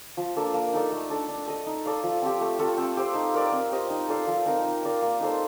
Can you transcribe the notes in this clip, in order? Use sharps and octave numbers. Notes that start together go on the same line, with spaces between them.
F3
A#3 D4 A4
A#3
D#4 A4 D5
A3
D4 A4 D5
D4
A4 D#5
D#4
A4 D5 F5
F3
C4 G4
A3
C4 F4 A4
C4
G4 C5
D#4
A#4 D5
C4
G4 C5 D#5
D#4
A4 D5 F5
F3
C4 D#4 A#4
D#4
A#4 D5 F5
A#3
D#4 A4 C5